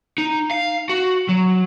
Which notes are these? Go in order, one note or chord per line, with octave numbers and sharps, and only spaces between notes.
D#4
F5
F#4
F#3